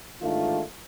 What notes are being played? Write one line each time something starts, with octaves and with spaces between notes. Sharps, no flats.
A1 G#2 D#3 A3 D4 F4